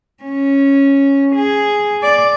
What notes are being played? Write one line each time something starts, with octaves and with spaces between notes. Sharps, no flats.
C#4
G#4
D5